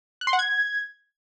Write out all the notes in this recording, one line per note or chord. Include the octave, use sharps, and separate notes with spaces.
F#6
C6
F#5
G#6